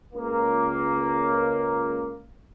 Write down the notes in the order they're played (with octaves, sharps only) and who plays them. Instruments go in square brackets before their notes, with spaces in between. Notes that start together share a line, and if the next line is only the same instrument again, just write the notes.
[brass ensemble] C#2 A#3